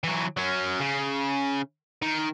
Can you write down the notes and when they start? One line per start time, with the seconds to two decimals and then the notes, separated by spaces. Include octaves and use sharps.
0.04 E3 F#3
0.37 F#3 C#4
0.80 C#3
2.02 D#3